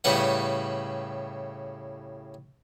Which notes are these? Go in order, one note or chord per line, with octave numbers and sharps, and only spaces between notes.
A2 C#3 G3 B4 F#5